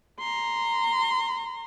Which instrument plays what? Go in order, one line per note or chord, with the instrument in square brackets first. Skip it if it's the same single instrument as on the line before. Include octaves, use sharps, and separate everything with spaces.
[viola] A#5 C6